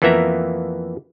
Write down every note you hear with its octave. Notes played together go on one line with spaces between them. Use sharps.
F2 E3 A#3 B3 E5 A#5